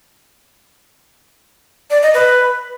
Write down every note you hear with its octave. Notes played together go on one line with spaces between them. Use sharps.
D5
D#5
B4